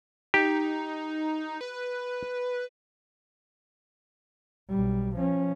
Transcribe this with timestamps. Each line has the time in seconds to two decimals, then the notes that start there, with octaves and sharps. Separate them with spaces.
0.34 D#4 G4
1.61 B4
4.70 B1 G3
5.15 F3 C#4